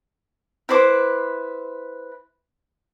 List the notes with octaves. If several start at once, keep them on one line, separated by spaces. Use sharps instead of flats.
E4 B4 C5 D6